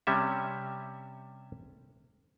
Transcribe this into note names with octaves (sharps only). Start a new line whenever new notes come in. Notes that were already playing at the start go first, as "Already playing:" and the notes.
C3 G3 C#4 E5